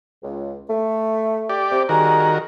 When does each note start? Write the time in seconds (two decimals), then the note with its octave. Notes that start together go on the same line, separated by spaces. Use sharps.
0.22 C#2
0.68 A3
1.49 G4 D5
1.71 C3
1.89 D#3 G3 F#4 G#4 A#4 A#5